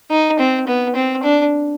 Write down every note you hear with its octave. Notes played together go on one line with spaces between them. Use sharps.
D#4
C4
B3
C4
D4